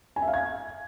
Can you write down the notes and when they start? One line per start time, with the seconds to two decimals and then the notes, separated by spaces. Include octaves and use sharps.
0.16 G#5
0.22 E5
0.28 F5
0.34 G#6